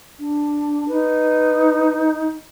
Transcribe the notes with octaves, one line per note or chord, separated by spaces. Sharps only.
D4
D#4 B4